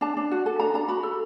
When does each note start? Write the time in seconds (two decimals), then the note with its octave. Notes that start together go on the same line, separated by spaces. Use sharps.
0.01 D4 A5
0.17 D4
0.31 F#4
0.46 A4
0.59 D4 A#5
0.74 D4 A#5
0.88 F#4 B5
1.03 A4